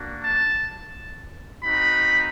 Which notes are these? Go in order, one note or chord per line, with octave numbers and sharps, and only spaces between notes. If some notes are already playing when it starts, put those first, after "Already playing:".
Already playing: A#3 D4 F#4
A5
C4 D#4 F#4 B5